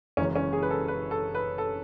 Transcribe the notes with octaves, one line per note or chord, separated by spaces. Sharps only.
F#1 F#2 E3 G#3 C#4
C#4
G#4
B4
A4
B4
A4
B4
A4